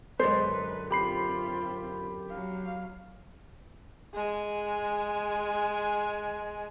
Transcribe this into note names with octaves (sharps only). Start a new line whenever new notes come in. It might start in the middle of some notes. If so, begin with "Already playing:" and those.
F#2 D3 G#3 B4 C5
C4 F4 G4 B5 C7
F#3 F5
G#3 G#5